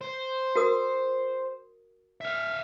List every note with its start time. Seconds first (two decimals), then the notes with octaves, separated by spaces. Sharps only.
0.01 C5
0.55 F#4 A#4 D#6
2.21 E5 F5